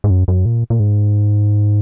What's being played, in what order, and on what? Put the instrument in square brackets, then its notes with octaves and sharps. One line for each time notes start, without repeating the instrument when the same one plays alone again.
[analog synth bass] G#2
F#2
F#2
A#2
A#2
G#2